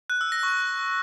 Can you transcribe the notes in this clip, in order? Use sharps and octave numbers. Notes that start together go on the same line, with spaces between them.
F#6
E6
A#6
C#6